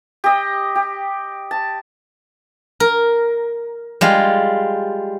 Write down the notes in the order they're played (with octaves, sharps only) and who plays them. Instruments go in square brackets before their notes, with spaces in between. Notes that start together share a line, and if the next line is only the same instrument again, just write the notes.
[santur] G4 D#5
G4
A5
[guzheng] A#4
G3 G#3 F4